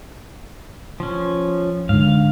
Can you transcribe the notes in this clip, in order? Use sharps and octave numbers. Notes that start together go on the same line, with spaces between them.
F3 C#4
G#2 D3 F5